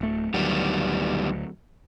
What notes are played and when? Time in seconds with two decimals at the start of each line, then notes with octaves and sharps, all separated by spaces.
0.01 D1 A3
0.34 D2 D#3 F#3 G3 B3